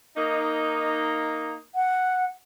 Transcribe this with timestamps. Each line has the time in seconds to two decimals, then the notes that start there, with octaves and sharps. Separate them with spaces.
0.16 A#3 D#4
1.75 F#5